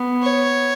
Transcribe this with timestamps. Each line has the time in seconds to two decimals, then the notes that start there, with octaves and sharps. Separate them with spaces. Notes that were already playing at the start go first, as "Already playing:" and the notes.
Already playing: B3
0.23 C#5